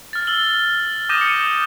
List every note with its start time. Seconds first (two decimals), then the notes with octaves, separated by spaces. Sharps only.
0.13 F6 A6
0.27 E6 F#7 G7
1.09 D6 D#6 G6 A#6 D#7 E7
1.21 C#7